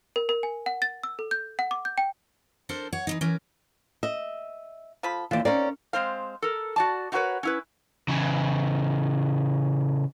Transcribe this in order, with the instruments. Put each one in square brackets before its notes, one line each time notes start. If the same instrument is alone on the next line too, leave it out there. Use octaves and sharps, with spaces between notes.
[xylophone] A#4
A#4
G#5
F#5
A6
E6
A4
G6
F#5
D6
G6
G5
[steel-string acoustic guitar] D4 A4 A#4 C5
C#5 F#5
E3 F#3 D#4
E3 C#4 A#4
[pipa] D#5 [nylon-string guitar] E5
[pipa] F3 A4 B5
[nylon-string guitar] D#2 E3 [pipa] F4 D5
[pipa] A#3 C4 D#4 [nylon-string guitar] C#4 A#4 D5
[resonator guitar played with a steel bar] G#3 C4 C5 F5
A4 A#4
F#4 D5 A5
D#4 E4 F#4 A#4 B4 C#5
C#4 E4 B4
[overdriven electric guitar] C#3 E3